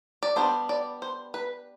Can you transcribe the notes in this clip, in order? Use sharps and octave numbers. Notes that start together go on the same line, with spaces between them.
D5
G3 B3 D4 C5
D5
C5
B4